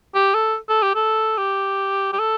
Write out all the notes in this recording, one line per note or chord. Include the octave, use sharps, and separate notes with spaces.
G4
A4
A4
G4
A4
G4
G4
A4